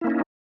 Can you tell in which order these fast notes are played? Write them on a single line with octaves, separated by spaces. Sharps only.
E4 A#3 C#4 D#4